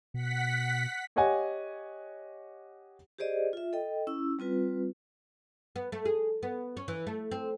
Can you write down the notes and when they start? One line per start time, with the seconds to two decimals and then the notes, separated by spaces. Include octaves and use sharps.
0.14 B2 F#5 B6
1.16 G4 C#5 D#5 F#5 G#5
3.19 G4 G#4 C5 D5 D#5
3.53 F4 E5
3.73 A4 D#5 G5
4.07 C#4 E4 E6
4.39 G3 C4 F4 B4
5.76 B3
5.92 A3
6.05 G#4
6.43 B3
6.77 C#4
6.88 E3
7.07 A3
7.31 C4